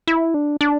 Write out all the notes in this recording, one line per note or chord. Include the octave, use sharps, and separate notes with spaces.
E4
D4
D4